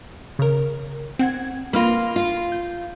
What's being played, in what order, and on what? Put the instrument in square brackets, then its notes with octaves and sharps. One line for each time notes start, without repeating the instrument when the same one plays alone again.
[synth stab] C#3 A#4
C4 F#5 G#6
[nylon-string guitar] A#3 F4 [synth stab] B5 F6 A#6
[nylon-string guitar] F4
[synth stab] G6